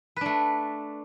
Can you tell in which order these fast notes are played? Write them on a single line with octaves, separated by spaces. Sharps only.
B4 D4 A3